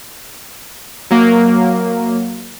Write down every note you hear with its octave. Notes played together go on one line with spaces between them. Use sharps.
F#3 A#3